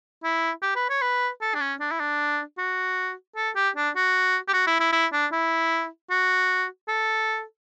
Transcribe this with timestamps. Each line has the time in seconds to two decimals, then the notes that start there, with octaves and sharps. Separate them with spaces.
0.24 E4
0.62 G4
0.76 B4
0.89 C#5
1.01 B4
1.41 A4
1.55 D4
1.60 C#4
1.80 D4
1.91 E4
2.00 D4
2.58 F#4
3.36 A4
3.56 G4
3.76 D4
3.96 F#4
4.48 G4
4.54 F#4
4.67 E4
4.80 E4
4.92 E4
5.13 D4
5.32 E4
6.11 F#4
6.88 A4